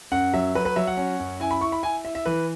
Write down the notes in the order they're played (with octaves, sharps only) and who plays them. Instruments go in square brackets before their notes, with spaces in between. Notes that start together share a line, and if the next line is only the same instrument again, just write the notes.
[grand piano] F#2 F#5
F#3 E5
F#3 B4
B4
F#3 E5
F#5
C#4
F#2
E4 G#5
B5
E4 C#6
B5
E4 G#5
E4 E5
E5
E3 B4